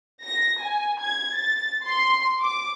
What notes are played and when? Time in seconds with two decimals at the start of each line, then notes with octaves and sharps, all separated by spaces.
0.23 A#6
0.61 G#5
1.01 G#6
1.35 A6
1.85 C6
2.41 D6